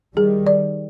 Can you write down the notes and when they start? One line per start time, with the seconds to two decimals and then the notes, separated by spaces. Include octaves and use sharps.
0.16 D#3 G3 G#4
0.47 D5